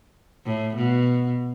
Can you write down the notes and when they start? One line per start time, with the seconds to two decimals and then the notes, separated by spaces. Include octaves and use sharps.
0.46 A2
0.76 B2